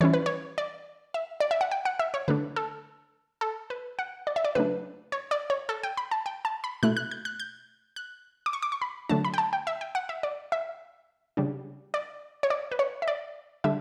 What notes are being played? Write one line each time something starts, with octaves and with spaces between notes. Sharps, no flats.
E3 G3 C#4 E4 C#5
B4
C#5
D5
E5
D5
E5
F#5
G5
F#5
E5
C#5
D3 A3 D4 B4
A4
A4
B4
F#5
D5
E5
D5
C#3 F#3 A3 D4 B4
C#5
D5
C#5
A4
G5
B5
A5
G5
A5
B5
B2 A3 E4 F#6
F#6
G6
F#6
G6
F#6
D6
C#6
D6
C#6
B5
D3 F#3 A3 D4 A5
B5
G5
A5
G5
E5
G5
F#5
E5
D5
E5
C#3 G3 D4
D5
C#5
D5
B4
C#5
E5
D5
D3 G3 D4 E5